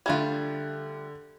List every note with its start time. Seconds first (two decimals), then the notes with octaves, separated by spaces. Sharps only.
0.06 D3 G3 A3 F4 G#6